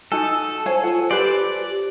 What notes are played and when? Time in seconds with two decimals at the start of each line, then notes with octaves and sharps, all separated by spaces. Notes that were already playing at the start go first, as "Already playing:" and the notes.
0.12 D#4 F#4 A4 G#5
0.66 C5 C#5 F5 G#5
0.84 F4 F#5 G#5
1.11 G4 A4 B4 C5 D5